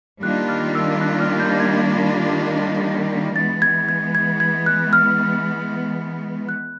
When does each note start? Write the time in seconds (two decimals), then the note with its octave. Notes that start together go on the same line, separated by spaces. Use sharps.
0.23 D#3 G3 A#3 D4 F4 F#6
0.49 F6
0.75 E6
1.01 F#6
1.20 F6
1.40 G6
1.60 G#6
3.36 E3 G#3 B3 A6
3.62 G#6
3.89 G#6
4.15 G#6
4.40 G#6
4.66 F#6
4.93 F6
6.49 F#6